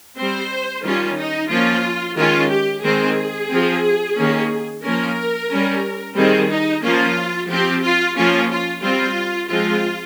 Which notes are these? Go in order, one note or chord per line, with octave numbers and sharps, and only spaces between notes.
G3 C4 C5
D#3 G3 C#4 F4
D#4
F3 A#3 C#4 F4
D#3 G#3 C#4 F4
G4
D#3 G#3 C4 G#4
F3 C4
D#3 A#3 C#4
F3 A#3 C#4 A#4
G3 C#4
D#3 G3 C4 G#4
D#4
F3 A#3 C#4 F4
F3 C4 G4
F4
F3 A#3 C#4 F4
F4
G3 C4 F4
F3 G#3 C4 F4